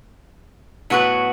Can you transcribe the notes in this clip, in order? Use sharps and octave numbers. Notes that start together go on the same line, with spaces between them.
A2 F#3 B3 F#4 B4